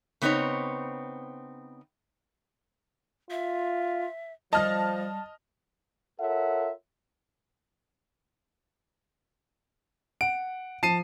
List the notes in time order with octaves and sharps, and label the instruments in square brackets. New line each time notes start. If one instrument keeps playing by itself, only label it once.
[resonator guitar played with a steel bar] C#3 B3 C4 D#4 C#5
[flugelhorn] F4 [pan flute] E5
[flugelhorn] F3 [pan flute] G3 [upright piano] D#5 [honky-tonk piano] A5 F6 A#6
[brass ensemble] F4 A4 A#4 C#5 E5 F#5
[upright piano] F#5 [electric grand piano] D7
[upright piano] F3 [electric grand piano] A5 C7 D#7